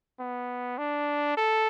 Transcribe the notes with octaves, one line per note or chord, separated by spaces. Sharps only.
B3
D4
A4